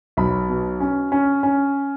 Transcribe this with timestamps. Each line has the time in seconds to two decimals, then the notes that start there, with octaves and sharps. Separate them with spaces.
0.17 B1 B5
0.49 B2
0.80 C#4
1.12 C#4
1.43 C#4